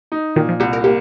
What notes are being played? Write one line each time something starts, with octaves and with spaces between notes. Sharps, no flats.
D#4
A#2 D#3
F3
C2 G4
A#4
A#3 G4